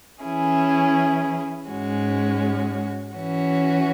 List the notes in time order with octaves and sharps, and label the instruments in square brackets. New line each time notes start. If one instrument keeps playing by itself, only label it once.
[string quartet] E3 C#4 E4 G#4
G#2 G#3 C#4 F#4
E3 C#4 F#4